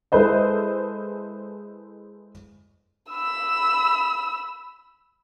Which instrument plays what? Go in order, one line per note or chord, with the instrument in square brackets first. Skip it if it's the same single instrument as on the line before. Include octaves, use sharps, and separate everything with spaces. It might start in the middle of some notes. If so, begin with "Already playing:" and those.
[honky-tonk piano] G#3 E4 A4 B4 C5 D#5
[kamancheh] B5 E6